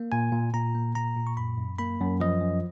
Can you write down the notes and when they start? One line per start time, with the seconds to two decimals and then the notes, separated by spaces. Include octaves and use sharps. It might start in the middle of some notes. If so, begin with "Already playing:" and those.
Already playing: A#3
0.12 A#2 G#5
0.32 A#2
0.53 A#2 A#5
0.75 A#3
0.95 A#2 A#5
1.17 A#2
1.27 C#6
1.37 F#2 B5
1.58 F#2
1.79 A#3 B5
2.01 F#2
2.20 F3 D#5
2.41 F#2